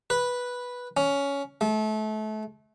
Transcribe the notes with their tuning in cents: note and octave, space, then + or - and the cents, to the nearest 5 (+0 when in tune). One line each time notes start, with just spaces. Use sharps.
B4 -5
C#4 +15
A3 -30